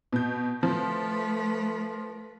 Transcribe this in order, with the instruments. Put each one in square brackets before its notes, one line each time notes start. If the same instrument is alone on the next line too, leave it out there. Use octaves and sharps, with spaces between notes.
[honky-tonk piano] B2 G6
[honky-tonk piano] F3 [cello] A3 B4